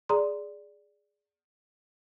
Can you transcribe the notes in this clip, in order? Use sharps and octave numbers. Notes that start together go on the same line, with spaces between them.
G#4 D5 A#5 C6